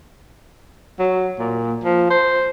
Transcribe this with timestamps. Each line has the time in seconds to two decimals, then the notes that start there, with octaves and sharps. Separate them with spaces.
0.99 F#3
1.39 A#2
1.84 F3
2.10 C5